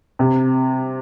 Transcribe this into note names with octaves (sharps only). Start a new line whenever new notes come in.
C3